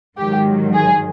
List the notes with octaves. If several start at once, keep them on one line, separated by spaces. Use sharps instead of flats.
G#2 D#3 F#3 G4
G#4